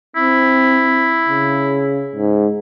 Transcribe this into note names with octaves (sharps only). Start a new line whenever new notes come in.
C4 E4
C#3
G#2